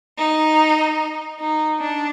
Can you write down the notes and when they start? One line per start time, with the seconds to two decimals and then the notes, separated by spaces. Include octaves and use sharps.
0.18 D#4
1.40 D#4
1.81 D4